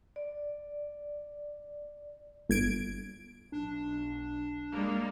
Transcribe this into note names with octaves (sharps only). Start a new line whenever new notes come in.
D5
G1 G#6 D7
B1 D4
G3 G#3 A#3